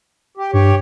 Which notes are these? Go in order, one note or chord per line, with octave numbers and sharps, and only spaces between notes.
G4
G2 G4 C#5